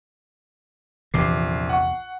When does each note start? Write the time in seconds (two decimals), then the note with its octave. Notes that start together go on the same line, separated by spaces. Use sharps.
1.14 A#1 E2 C3 E3 D6 C7
1.69 F#5 C#6